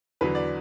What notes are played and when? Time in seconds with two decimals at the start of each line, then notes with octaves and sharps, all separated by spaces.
0.21 E2 D3 F#3 B4
0.35 D5